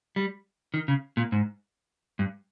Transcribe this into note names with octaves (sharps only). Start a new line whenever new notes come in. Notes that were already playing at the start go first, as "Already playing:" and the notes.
G3
D#3
C#3
A#2
G#2
G2